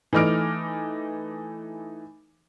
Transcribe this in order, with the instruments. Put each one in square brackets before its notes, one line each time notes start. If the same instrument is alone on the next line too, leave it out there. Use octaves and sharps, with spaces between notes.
[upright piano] E3 A3 D#4 D6 F6 D7